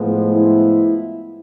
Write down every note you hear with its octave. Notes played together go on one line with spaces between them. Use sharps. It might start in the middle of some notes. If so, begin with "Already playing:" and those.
Already playing: A2 F3 G#3 B3
E4